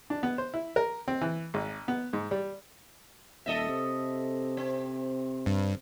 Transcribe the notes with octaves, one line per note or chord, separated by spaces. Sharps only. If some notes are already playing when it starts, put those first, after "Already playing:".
D4
B3
C5
E4
A#4
C4
E3
G#1
B3
G#2
G3
D#1 A4 D#5 E5
C3
C4
G2